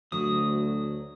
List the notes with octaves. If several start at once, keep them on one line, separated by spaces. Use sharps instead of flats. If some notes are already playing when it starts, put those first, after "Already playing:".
D2 F#3 D#6